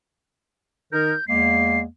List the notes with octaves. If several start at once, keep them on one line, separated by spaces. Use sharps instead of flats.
D#3 D#4 A#4 G6
E2 G#3 A#3 C7